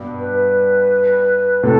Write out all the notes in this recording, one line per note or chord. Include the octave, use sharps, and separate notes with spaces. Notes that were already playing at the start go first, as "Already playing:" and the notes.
Already playing: G2 B2
B4
A2 C3 A4